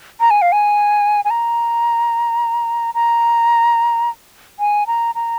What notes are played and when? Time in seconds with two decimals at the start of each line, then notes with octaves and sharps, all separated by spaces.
0.20 A#5
0.31 G#5
0.42 F5
0.52 G#5
1.25 G#5
1.30 A#5
2.94 A#5
4.59 G#5
4.87 A#5
5.15 A#5